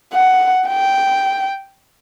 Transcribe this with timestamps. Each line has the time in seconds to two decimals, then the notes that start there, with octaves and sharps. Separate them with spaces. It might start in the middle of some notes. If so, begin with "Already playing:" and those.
0.13 F#5
0.68 G5